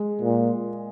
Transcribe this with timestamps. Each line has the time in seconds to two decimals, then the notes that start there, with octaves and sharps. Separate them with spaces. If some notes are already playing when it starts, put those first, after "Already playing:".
Already playing: G#3
0.22 A#2